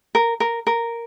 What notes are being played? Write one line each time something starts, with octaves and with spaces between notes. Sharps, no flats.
A#4
A#4
A#4